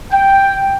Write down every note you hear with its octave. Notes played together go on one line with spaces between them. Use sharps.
G5